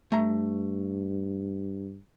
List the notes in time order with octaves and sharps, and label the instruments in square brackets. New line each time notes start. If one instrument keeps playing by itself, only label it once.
[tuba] G2 [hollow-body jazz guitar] A3 A#5